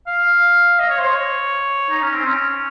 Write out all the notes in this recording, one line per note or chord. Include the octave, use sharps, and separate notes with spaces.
F5
D#5
C#5
C5
C#5
D#4
C#4
C4
C#4